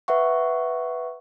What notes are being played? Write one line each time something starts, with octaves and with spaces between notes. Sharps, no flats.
B4 E5 F#5 C#6